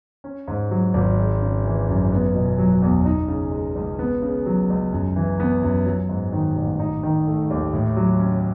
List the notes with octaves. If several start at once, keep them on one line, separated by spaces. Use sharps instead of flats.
C#4
G#2
F#3
G#1
G#3
C#3
E3
F#2
B3
B2
F#3
E2
D#4
C#3
G#3
C#2
B3
C#3
F#3
C#2
F#2
E3
B3
F#2
F#3
G#2
D#3
A1
D#4
D#3
A3
D#2
A2
F#3
C#4